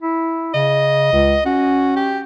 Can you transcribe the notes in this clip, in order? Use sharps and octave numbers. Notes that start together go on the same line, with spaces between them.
E4
C#3 D#5
C#2
C#4 F#4
G4